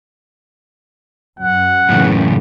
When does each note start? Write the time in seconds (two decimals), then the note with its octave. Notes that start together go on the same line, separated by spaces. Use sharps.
1.40 F#2 F#5
1.89 F#2 A2 C#3 E3